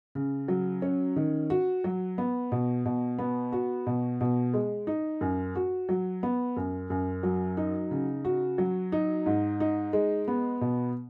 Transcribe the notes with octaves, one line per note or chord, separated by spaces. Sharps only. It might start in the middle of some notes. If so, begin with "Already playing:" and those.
C#3
F#3
C#4
D#3
F#4
F#3
B3
B2
B2
B3
F#4
B2
B2
G#3
D#4
F#2
F#4
F#3
B3
F#2
F#2
F#3
D#4
C#3
F#4
F#3
D#4
G#2
D#4
G#3
B3
B2